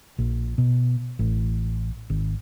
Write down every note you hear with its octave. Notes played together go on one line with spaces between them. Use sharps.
A#1
B2
A1
G#1